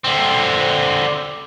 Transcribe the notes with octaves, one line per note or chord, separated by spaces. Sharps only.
D3 C4